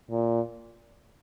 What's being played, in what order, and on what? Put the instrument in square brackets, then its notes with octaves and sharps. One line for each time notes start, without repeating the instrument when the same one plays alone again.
[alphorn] A#2